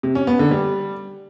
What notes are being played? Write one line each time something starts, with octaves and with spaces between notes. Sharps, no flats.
C3
C#4
B3
D3
G3